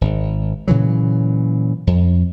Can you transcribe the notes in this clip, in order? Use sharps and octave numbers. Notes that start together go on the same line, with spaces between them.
G#1
A#2 C#3 E3 F#3
F2